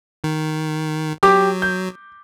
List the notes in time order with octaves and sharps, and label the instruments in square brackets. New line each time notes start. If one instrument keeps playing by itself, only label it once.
[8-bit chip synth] D#3
[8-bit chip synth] F#3 [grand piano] G4 D6
[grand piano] G6